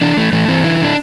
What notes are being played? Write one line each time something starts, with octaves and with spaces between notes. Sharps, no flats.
E3 D4
E3 A3
E3 A3
E3 C4
D3 E4
D3 D4